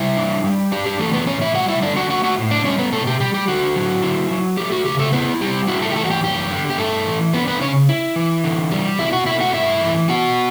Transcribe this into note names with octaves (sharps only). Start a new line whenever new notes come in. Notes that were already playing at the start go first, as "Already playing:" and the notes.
Already playing: G3 E4 E5
D4
G3
D4 G4
G4
E3 A3 A4
B3 B4
A2 C#4 C#5
E4 E5
G3 F#4 F#5
E4 E5
D3 D4 D5
F#4 F#5
A3 F#4 F#5
F#4 F#5
A2
D4 D5
G3 C#4 C#5
B3 B4
B2 A3 A4
G4
G3 G4
G4
D3 F#4
F#3
E4
F#3
A3 G4
F#4
C#3 G4
A3 A4
B3 E4 B4
G3 G4
E4 F#4
A3 A4
G4
E3 A3 A4
F#4
G4
F#2 G4
D3
G4
G2 A3 A4
E3
B3 D4 B4
B3 B4
C#3 C#4 C#5
E4
E3
D3
G3
B2 E4 E5
F#4 F#5
A3 E4 E5
F#4 F#5
G2 E4 E5
E3
B3 F#4 F#5